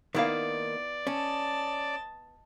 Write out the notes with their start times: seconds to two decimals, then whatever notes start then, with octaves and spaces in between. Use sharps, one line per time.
0.15 D#3 A#3 B3 E4 D5 F5
1.07 C#4 D#5 A5